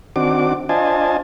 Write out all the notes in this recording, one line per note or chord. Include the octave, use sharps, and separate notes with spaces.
D#3 C4 D4 F#4 D6
D4 F4 C5 D#5 G#5 A5